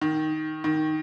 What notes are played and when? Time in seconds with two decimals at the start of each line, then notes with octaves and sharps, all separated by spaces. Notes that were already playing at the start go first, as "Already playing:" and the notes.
0.01 D#3
0.64 D#3